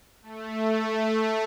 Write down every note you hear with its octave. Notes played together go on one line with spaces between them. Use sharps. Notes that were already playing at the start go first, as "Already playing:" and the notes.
A3